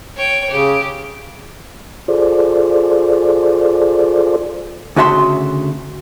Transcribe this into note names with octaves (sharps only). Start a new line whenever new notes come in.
C#5 G5
C#3 G4
F4 G#4 A4 C5 D5
D2 C#3 F#4 E5 A#5 C6